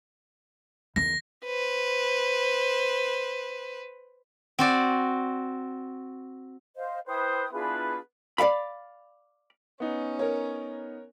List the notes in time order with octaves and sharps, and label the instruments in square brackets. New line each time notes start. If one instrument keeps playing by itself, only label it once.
[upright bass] E2 D#3 [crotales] A#6
[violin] B4 C5
[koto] C4 F#4 D5
[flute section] C5 D#5 F5
[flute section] E4 G5 D#6 [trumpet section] B4 C5
[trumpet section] B3 E4 B4 [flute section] D4 F4 G#4
[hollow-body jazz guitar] D5 E5 F5 B5
[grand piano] B3 D#4 [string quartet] C#4
[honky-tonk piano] A#4 C#5